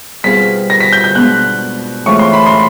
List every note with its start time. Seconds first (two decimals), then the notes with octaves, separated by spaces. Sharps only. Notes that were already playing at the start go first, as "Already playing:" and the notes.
0.23 B2 G3 C4 F4 G#4 B6
0.70 A#6
0.81 B6
0.93 G6
1.04 G6
1.15 B2 G#3 B3 D4 F#6
2.06 A2 E3 G#3 C4 F4 C#6
2.19 C6
2.33 B5
2.46 C6